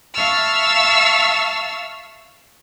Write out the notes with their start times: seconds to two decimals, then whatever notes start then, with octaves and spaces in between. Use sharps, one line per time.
0.14 E5 F5 A5 C#6 E6 F6